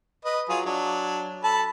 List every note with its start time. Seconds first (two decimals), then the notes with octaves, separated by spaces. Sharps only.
0.25 B4 D#5
0.49 F#3 F4 G#4
0.65 F#3 D4
1.43 A4 A5 B5